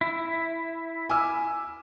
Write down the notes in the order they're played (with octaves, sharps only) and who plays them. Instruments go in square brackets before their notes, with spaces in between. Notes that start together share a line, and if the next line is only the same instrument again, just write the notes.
[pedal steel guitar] E4
[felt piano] G#5 D6 E6